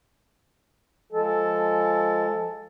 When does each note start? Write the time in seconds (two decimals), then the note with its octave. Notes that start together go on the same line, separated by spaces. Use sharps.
1.13 F3 G#3 A4